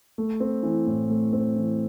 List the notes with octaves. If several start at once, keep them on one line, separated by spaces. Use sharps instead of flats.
A3
C4
E3
A2
A3
C4
E3